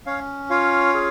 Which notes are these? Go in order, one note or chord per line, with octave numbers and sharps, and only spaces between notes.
C#4 C#5 F5
F4 C#5 F5
G#4